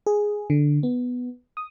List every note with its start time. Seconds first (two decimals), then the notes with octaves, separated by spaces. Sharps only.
0.06 G#4
0.50 D3
0.83 B3
1.57 D#6